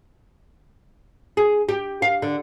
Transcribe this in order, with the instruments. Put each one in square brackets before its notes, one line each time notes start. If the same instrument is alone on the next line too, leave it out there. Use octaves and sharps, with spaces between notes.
[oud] G#4
G4
F5
D3